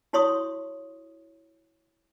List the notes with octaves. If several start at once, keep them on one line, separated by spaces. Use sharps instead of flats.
E4 F#4 C#5 C6 C#6 D#6